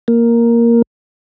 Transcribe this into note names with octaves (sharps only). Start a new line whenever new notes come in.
A#3